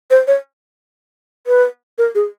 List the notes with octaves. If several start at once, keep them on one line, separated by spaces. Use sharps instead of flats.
C5
C#5
B4
A#4
G#4